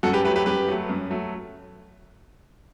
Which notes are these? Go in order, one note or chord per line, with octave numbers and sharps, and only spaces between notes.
F#2 F#4 A4
G4 B4
F#3 A3 G4 B4
G4 B4
F#2 G4 B4
F#3 A3
F#2
F#3 A3